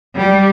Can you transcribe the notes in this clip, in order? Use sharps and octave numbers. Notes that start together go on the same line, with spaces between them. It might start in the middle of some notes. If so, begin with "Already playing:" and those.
G3